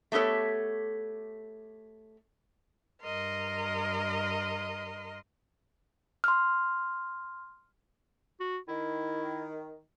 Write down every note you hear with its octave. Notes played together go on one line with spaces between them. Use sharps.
A3 B3 G4 A4 C#5
G2 A#4 D#5 C6
C6 F6
F#4
D#3 E4